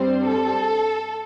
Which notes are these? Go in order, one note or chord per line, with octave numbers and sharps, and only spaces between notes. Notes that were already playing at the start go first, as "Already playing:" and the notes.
Already playing: G2 G3 C4 C5
A4